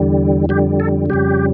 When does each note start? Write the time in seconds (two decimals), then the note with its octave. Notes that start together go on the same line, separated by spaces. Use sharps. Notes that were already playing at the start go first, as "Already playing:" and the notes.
Already playing: E2 D3 G3
0.49 F2 D3 G3 G4
0.80 A4
1.10 F2 C#3 G3 G4